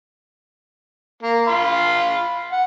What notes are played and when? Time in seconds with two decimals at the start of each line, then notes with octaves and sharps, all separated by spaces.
1.23 A#3
1.48 F5 B5 C6
2.52 F#5